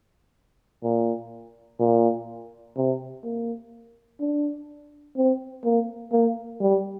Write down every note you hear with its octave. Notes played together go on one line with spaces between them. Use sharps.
A#2
A#2
C3
A#3
D4
C4
A#3
A#3
G3